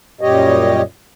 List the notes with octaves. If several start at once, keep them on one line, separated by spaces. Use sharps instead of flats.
F#2 A#2 G3 G4 C#5 D#5